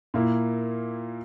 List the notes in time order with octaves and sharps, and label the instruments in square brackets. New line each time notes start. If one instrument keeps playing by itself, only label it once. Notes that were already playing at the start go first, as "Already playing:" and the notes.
[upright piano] A#2 A#3 E4